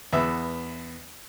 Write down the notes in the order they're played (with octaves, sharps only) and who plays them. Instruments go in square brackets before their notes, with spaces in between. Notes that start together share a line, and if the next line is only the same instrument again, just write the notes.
[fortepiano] E2 B3 E5